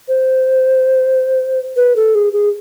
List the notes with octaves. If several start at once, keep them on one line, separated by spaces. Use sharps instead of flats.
C5
B4
A4
G#4
G#4